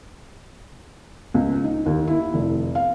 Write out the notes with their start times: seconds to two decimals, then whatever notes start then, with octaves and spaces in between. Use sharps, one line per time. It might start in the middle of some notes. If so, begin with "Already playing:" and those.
1.34 C#2
1.64 D#4
1.86 D#2
2.08 E4
2.34 F1
2.75 F5